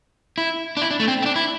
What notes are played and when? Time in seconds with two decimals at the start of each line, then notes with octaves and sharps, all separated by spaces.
0.38 E4
0.77 D4
0.82 E4
0.91 D4
1.00 A3
1.08 C4
1.22 C4
1.26 D4
1.36 E4